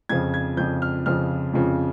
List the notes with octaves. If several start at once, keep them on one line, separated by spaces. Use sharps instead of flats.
F2 C#3 F3 G#6
G#6
F2 C#3 F3 G6
F6
F2 C#3 F3 F6
F2 C#3 F3